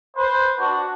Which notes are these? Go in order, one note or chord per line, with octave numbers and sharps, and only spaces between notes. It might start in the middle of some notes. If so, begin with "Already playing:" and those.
B4 C5
D4 F#4